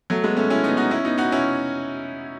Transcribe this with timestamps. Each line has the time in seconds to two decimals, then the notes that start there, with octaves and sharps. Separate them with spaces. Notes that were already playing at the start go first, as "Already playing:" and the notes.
0.10 F#3 A3
0.24 G#3 B3
0.37 A3 C#4
0.50 C#4 E4
0.64 B3 D#4
0.77 D#4 F#4
0.91 C#4 E4
1.05 B3 D#4
1.18 D#4 F#4
1.32 C#4 E4